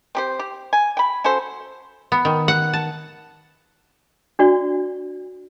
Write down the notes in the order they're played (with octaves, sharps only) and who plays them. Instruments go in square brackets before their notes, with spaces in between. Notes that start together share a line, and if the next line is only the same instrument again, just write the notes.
[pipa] C4 G4 C5
G4
G#5
G5 B5
C#4 F#4 A4 C5
[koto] B3
D#3
F#5
A5
[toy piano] D4 F#4 D5